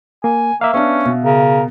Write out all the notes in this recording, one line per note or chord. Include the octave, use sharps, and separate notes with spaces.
A#3 G#5
A#3 E5 F5
B3 C#4 D4
B2
C#3 A#4